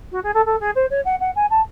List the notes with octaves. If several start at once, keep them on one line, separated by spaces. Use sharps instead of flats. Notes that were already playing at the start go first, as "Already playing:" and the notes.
F#4
G#4
A4
A4
G#4
C5
C#5
F#5
F#5
G#5
A5